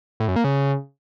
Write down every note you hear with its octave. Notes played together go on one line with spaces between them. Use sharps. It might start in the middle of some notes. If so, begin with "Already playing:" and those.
A2
F#2
A#3
C#3